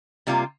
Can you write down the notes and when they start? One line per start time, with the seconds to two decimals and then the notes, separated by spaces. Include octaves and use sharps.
0.27 C3 G3 A#3 F4